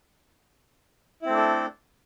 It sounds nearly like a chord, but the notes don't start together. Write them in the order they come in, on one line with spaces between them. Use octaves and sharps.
E4 C4 A3 D4 A4